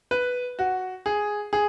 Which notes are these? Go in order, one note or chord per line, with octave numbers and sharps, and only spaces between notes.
B4
F#4
G#4
G#4